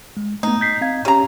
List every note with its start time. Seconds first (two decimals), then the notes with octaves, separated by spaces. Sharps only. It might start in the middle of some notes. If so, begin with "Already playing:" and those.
0.17 G#3
0.43 A3 B3 D#4
0.61 G6 B6 C7
0.81 C4 F5 G#6
1.05 C#3 C#4 G4 C#5 A#5